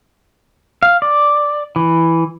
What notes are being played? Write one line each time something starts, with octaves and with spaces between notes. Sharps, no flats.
F5
D5
E3